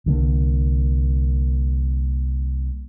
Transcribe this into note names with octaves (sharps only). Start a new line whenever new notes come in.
C2 D3 E3 A#3